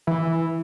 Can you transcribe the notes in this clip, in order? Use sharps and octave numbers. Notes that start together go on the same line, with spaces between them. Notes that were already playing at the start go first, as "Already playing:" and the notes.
E3